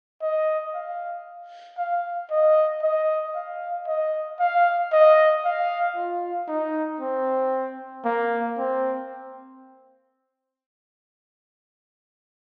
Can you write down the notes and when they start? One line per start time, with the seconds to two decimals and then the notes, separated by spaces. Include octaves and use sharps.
0.22 D#5
0.74 F5
1.78 F5
2.31 D#5
2.83 D#5
3.35 F5
3.87 D#5
4.40 F5
4.93 D#5
5.44 F5
5.96 F4
6.48 D#4
7.01 C4
8.05 A#3
8.58 C4